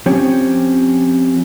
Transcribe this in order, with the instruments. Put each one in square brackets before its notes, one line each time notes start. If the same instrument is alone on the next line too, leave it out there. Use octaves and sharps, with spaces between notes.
[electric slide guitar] F3 C4 C#4 G4